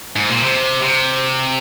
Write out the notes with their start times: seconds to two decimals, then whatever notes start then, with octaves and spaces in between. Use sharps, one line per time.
0.16 G#2
0.30 A#2
0.43 C3
0.82 C3